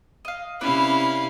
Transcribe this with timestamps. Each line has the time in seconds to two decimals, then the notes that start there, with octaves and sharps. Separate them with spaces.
0.25 D#5 F5
0.61 C3 C#4 E4 B4 D5 F5